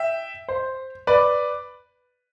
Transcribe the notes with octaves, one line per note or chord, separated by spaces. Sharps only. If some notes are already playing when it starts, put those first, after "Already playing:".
Already playing: E5 G5
C5
B4 D5